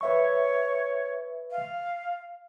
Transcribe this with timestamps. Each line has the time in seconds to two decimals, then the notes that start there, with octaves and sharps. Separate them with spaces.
0.01 B4 C#5 E5 C#6
1.51 F5